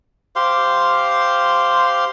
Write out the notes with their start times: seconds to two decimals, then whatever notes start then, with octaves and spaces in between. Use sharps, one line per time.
0.36 G4 C5 F5 C6